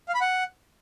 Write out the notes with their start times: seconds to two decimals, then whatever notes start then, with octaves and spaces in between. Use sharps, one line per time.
0.08 F5
0.15 B5
0.21 F#5